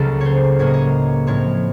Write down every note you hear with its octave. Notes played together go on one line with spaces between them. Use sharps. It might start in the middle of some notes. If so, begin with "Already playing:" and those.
Already playing: C#2 C#3 F#3 A#3 A4
C5 C#5
A2 F#3 A#3 C#5
D#5
C#5
A2 F3 C4 C#5